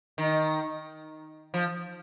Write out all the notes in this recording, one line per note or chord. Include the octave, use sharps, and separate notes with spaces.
D#3
F3